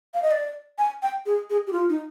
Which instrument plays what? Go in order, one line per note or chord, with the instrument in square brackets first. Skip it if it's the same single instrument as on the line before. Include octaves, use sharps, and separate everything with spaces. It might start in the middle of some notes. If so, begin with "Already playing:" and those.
[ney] F5
D#5
D5
G#5
G5
G#4
G#4
G4
F4
D#4